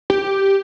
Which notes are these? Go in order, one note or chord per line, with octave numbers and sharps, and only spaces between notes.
G4